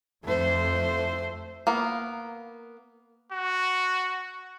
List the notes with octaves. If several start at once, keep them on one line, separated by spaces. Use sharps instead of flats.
F2 A3 C5
A#3 B3
F#4